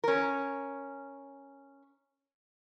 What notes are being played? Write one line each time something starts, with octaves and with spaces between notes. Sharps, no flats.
C#4 A#4